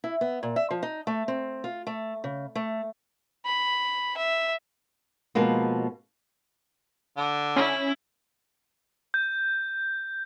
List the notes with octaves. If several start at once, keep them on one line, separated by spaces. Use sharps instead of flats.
E4
B3
A#2
E5
F3
D#4
A3
C4
F4
A3
C#3
A3
B5
E5
B2 F3 G#3 A#3 B3
D3
C#4 E4
G6